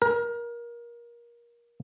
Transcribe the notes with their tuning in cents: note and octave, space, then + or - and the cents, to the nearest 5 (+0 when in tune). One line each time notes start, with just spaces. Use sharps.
A#4 +25